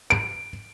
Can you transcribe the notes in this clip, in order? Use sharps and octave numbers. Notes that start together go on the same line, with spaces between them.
D7